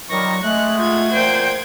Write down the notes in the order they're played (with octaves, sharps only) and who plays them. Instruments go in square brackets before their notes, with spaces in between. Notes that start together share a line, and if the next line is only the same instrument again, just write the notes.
[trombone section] A#2 D#3 G3 [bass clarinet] F#3 [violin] C#6 A#6
[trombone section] G#3 [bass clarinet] A3 [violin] F#6
[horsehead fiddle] F4 [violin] F#5 G#6
[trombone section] A#2 [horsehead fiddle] C5 G5